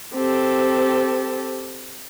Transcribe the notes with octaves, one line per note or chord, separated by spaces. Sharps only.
C4 G4 A4